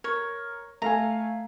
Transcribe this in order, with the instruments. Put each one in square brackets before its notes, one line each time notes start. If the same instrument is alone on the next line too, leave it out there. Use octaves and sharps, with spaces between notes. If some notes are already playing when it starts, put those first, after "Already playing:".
[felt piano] A#4 [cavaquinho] C#5
[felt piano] A3 F5 G#5 [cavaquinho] A#5